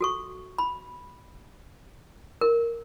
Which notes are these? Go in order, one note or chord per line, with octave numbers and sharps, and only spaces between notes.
F#4 A4 C#6
B5
A#4